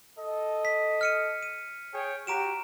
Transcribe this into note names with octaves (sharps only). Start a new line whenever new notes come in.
A4 D#5
B6
F6 C#7 D#7
D#7
G#4 C#5 G5
F#4 G4 A#5 D7 E7